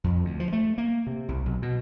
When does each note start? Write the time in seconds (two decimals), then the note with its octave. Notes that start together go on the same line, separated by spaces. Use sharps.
0.04 F2
0.25 D2
0.40 F3
0.53 A3
0.78 A#3
1.07 C3
1.28 C2
1.46 B1
1.62 B2